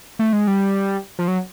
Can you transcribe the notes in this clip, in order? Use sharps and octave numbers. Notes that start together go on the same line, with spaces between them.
A3
G#3
G3
F3
F#3